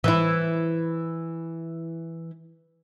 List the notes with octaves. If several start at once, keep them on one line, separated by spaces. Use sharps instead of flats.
E3 E4